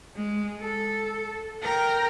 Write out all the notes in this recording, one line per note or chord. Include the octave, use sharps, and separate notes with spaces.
G#3
A4
A#4 G5